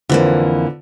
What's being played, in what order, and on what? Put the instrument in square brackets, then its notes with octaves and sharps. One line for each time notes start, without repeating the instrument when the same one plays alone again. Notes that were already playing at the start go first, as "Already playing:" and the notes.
[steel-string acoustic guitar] F2 E3 A#3 [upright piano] D3 F4 B4